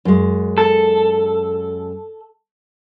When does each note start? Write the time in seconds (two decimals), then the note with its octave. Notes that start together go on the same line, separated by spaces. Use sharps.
0.05 F#2 G#3
0.58 A4